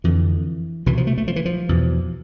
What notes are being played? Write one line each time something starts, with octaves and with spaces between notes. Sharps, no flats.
F2 D3 E3
C2 B2 E3
F3
A3
A3
F3
E3
F3
E2 B2